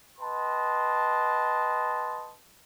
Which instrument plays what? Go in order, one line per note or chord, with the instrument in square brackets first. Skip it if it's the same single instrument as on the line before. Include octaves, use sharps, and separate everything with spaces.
[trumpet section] B4 D#5 G5 A5 C6